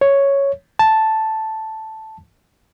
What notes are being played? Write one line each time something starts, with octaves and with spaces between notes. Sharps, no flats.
C#5
A5